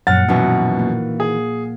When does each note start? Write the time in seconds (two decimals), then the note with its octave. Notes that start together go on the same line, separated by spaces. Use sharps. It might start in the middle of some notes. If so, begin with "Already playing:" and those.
0.07 F#2 A#2 F3 F#5 F6 A6
0.29 F#2 B2 D#3 E3 F#4
0.79 A#3
1.20 G#4